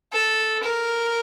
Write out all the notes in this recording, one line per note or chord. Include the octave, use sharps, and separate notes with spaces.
A4
A#4